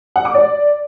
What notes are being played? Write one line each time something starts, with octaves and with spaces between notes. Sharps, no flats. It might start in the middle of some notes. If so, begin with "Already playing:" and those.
F#5
D6
D5